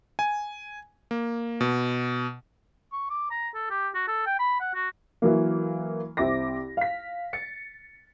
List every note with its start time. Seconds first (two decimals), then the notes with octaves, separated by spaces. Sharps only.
0.19 G#5
1.11 A#3
1.61 B2
2.92 C#6
3.10 D6
3.31 A#5
3.54 A4
3.70 G4
3.94 F#4
4.07 A4
4.26 G5
4.39 B5
4.60 F#5
4.74 F#4
5.22 E3 F#3 A#3
6.17 C2 C4 E5 D6 A#6
6.77 F5 B6
7.33 A6 C#7